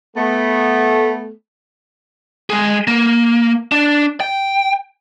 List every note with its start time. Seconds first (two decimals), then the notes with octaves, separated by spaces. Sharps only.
0.16 A3 B3
2.50 G#3 G#4
2.87 A#3
3.72 D4
4.20 G5